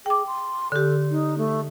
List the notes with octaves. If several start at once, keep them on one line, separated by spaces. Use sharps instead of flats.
G#4 G5 D6
C6
D3 G4 A4
D#4
A3